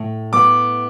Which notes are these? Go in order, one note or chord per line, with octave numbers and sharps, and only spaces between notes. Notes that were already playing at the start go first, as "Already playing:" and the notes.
Already playing: A2
B3 D6